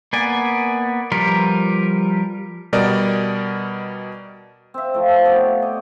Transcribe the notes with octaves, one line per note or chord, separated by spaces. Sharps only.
A#3 B3 D5 G#5
F3 G3 A#4 B4
B2 G3 A#4 D5 D#5
C4 E5
F3 A3
B3 G4 C#5 F5
D5 D#5